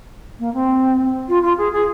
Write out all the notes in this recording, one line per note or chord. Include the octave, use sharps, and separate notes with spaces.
A#3
C4
F4
F4
G#4
G#4